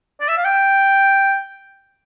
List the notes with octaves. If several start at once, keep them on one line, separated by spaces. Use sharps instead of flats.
D5
E5
F5
G5